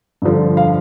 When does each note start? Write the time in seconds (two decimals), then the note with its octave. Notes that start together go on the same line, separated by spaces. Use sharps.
0.22 G2 D3 F3
0.57 F5